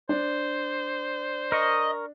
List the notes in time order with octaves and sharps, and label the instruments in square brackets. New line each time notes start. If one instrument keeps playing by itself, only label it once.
[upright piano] D4 [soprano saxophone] C5
[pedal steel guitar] A#4 C#6 [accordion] D#5